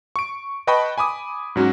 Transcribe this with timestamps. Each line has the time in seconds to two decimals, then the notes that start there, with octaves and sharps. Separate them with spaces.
0.16 C#6 D7
0.67 B4 D#5 G5 A5 B5 C#6
0.98 G#5 B5 D6 D#6
1.56 G#2 F#3 C#4 F#4